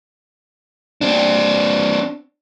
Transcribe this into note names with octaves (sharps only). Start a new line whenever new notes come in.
C4 D4